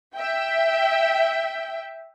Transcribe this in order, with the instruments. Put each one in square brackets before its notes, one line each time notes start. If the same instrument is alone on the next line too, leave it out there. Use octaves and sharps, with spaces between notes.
[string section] E5 G5